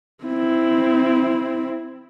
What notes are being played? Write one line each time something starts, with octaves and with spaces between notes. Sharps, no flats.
C4 E4